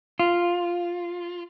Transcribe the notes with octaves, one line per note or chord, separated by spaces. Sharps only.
F4